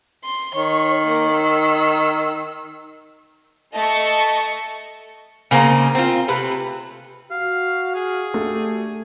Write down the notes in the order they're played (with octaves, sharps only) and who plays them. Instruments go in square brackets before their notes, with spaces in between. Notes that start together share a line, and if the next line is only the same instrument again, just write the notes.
[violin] C6
[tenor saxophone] D#3 [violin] C#5
[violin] A#3
E6
[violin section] A3 D#5 A5 C#6
[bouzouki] C#3 A#3 C4 D#4
C4 F4
C3 A3 B4
[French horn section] F#4 [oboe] F5
[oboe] G#4
[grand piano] A3 [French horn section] D4 F#4 G4